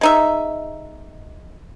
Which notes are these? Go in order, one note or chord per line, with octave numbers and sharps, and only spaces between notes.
G#3 D#4 E5